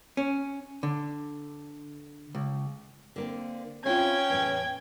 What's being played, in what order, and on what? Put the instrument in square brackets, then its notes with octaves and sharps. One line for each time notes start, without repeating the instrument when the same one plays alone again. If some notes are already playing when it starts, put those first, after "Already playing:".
[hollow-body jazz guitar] C#4
D3
C#2
[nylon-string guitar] D3 A#3 C4
[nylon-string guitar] C4 E4 F4 [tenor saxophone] C#4 [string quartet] G5 G#6
[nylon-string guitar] E2 A2